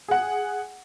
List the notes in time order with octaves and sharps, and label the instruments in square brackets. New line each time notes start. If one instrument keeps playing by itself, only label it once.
[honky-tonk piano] G#4 F#5